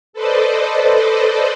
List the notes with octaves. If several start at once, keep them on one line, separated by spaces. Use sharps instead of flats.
A4 B4 C5 D5 D#5